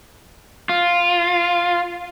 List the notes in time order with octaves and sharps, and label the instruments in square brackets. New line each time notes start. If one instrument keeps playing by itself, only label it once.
[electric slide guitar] F4